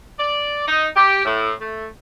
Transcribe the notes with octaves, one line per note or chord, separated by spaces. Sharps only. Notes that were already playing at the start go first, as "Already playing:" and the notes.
D5
D#4
G4
A2
A3